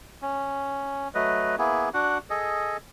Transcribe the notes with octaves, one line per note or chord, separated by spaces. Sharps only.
C#4
F#3 A3 B4 D#5
A#3 B3 E4 G#4
D4 F#4 F#5
G#4 A4 D#5